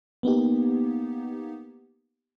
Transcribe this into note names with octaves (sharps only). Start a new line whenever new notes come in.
A#3 B3 D#4 G4